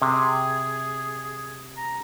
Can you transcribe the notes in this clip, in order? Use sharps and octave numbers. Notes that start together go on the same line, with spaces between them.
C3 G#4
A#5